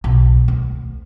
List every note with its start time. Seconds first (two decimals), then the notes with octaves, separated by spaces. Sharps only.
0.04 B1
0.48 D2